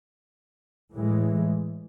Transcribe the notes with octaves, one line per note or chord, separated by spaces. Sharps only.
A2 E3 G#3